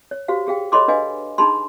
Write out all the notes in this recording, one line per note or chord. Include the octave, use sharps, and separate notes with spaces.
C#5
F#4 G4 C5 F5
G4 G#4 F5 G5
A4 C#5 D#5 B5 C6 D6
D4 B4 D#5 F5 G#5
D4 D#4 G#4 A5 B5 C6